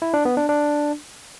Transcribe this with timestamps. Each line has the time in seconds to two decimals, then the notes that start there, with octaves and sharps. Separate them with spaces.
0.02 E4
0.14 D4
0.25 B3
0.37 D4
0.49 D4